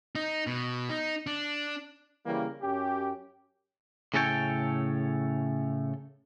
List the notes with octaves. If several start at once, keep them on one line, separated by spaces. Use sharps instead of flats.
D#4
B2
D#4
D4
C#3 E3 G3 A#3
F#2 C#4 G4
A2 C#3 C#4 A4 C#5 G5